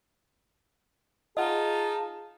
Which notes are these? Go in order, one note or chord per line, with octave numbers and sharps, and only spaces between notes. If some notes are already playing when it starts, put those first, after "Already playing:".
D#4 F4 G#4 D#5 F#5 A5